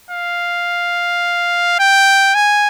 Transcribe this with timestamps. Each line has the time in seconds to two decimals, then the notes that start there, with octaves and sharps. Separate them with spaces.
0.10 F5
1.79 G5
2.34 G#5